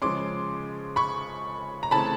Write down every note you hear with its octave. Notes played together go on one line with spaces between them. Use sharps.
C#3 F3 G#3 C#4 C6 D6
B5 C#6
A#5
C#3 E3 A3 C4 A5 B5